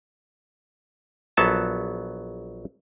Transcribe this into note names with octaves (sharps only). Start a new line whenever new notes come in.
A#1 F#3 B3 A4 E5 A5